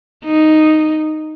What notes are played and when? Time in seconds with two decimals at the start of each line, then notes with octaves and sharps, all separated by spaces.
0.25 D#4